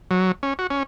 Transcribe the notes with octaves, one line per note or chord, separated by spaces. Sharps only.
F#3
C#4
F#4
C#4